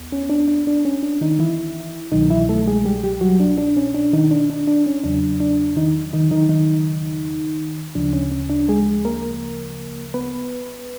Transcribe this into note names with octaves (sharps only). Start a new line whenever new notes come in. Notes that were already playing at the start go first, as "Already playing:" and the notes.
Already playing: D#2 B3
C#4
D4
D4
D4
C#4
D4
D#3 D#4
E3 E4
C2 B2 D#3 F#3 D#4
E3 E4
A3 A4
G#3 G#4
G3 G4
G3 G4
F#3 F#4
D4
D4
C#4
D4
D#3 D#4
D4
D4
D4
C#4
E2 C#3 F#3 D4
D4
D#3 D#4
D#3 D#4
D#3 D#4
D#3 D#4
D2 C#3 F3 D4
C#4
C#4
D4
G#3 G#4
A#3 A#4
B3 B4